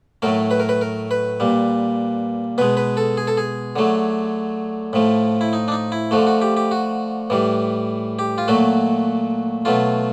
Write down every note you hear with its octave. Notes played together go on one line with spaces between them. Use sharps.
A2 F#3 A3 A#4
B4
A#4
B4
A#4
B4
A#2 G3
B2 G#3 B4
B4
A4
G#4
A4
G#4
D3 F#3 A3
A2 F3 A3
E4
D#4
D4
D#4
E4
D3 F3 A3 F#4
F#4
G4
G4
F#4
A2 E3 G3
G4
F4
A#2 F#3 A3 F#4
B2 F#3 A3 F4